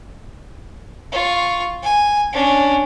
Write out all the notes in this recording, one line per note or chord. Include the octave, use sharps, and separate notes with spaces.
F4 C#6
G#5
C#4 D4